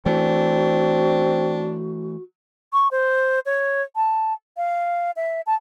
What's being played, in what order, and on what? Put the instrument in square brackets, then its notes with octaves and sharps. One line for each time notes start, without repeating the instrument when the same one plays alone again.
[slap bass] E3 A3 [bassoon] C4 [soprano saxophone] D4 [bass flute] F#4
[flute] C#6
C5
C#5
A5
F5
E5
A5